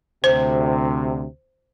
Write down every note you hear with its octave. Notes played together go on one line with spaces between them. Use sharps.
D2 C3 C5